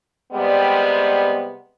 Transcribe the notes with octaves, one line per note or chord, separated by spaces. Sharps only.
C3 G3 G#3 B3 D5